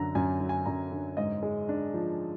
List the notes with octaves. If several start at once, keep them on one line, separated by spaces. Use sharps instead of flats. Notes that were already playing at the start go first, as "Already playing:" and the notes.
Already playing: F#2 D3 F#3 A#5
F#2 G#5
F#3
G#5
F#2 A#5
D3
G#2 D#5
G#3
D4
F3